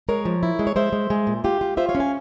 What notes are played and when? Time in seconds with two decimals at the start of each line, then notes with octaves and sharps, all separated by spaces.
0.09 G#3 A#4 C#5
0.25 F3
0.43 E4
0.59 G#3
0.67 C#5
0.76 G#3 C5 E5
0.93 G#3
1.10 G#3
1.27 A#2
1.44 F4 G4
1.61 F4
1.77 F4 C5 E5
1.89 C#5 F5
1.95 C#4
2.00 F5 G#5